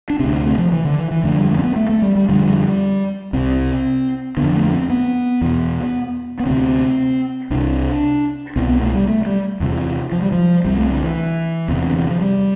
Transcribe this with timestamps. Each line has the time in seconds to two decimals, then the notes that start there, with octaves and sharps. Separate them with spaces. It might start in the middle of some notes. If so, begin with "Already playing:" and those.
0.10 D4
0.19 D2 C3 C4
0.33 C4
0.46 A3
0.58 F3
0.72 E3
0.85 D3
0.98 E3
1.11 E3
1.24 F2 D3 A3
1.37 G3
1.50 A3
1.59 C4
1.64 B3
1.76 A3
1.89 A3
2.02 G3
2.16 G3
2.29 F2 D3 G3
3.33 C2 C3 C4
4.37 D3 B3
4.42 F2
4.56 A3
4.73 C4
4.90 B3
5.41 E2 B2
6.40 B3
6.46 D2 C3 C4
7.50 C2 C3 D4
8.56 C2 B2 C4
8.69 B3
8.81 A3
8.94 G3
9.08 A3
9.25 G3
9.60 E2 C3
10.12 F3
10.22 G3
10.32 F3
10.65 C2 C3 G3
10.78 A3
10.90 D3
11.04 E3
11.68 E2 C3
11.87 D3
11.99 E3
12.09 F3
12.21 G3